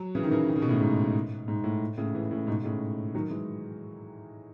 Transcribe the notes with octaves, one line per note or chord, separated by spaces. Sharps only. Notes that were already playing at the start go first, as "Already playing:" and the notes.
Already playing: F#3
C#3 E3
D#3
C#3 E3
D#3
C#3
B2
A2 C#3
G#2
G#2
A2
A2 C#3
C#3 E3
A2 C#3
G#2 B2
A2 C#3
D#3 F#3
E3 G#3